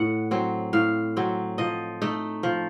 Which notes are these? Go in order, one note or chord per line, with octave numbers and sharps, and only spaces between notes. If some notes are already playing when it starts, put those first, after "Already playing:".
Already playing: A2 F#5
F#3 C4
A2 F5
F#3 C4
F3 D#5
A3 D#4
F3